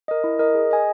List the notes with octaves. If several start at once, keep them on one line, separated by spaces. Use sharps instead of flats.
A#4 D#5
E4
A#4 D#5
G#4
D#5 G#5